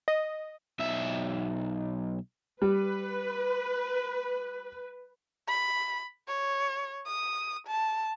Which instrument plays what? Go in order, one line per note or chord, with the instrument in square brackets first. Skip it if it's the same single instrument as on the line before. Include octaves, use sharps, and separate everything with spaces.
[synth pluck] D#5
[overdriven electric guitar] B1 E5
[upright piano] G3 [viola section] B4
[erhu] B5
C#5
D#6
A5